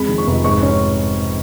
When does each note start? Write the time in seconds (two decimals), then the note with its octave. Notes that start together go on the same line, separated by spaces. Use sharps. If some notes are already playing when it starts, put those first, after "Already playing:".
Already playing: F2 G#3 B5
0.09 D#3
0.18 C#6
0.27 F1
0.44 G#2 C#6
0.63 C#4